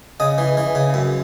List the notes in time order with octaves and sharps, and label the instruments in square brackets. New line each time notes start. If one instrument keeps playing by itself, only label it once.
[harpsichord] C#3 D#5
E3
E3
C#3
F#2